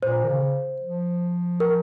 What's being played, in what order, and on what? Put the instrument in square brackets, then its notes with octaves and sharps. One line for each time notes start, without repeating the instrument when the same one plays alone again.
[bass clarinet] A#2 [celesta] C5
[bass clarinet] D#3
C#3
F3
[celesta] A#4